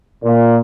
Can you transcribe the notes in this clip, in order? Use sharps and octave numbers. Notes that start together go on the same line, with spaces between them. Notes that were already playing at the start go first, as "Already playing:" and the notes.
A#2